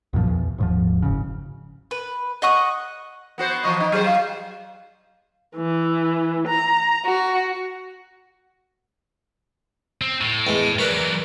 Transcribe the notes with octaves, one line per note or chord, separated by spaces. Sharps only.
B1 F#2 A#2 F3
E2
D#1 G#2 F3
F#1 C#3
B4
D#5 F#5 C#6 D#6
B3 F#4 C5
E3 F3 D#5 C#6
D#4
F#3 G#4 C5
F5
E3
A#5
F#4
C4
A2
E2 G#3
E3 F#3 A#4 B4 D5